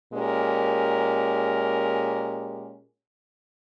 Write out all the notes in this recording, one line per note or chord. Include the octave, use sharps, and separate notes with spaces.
A#2 G#3 C#4 G4 A#4